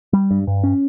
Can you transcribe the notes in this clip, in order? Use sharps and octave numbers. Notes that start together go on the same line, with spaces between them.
G3
G2
G2
C#4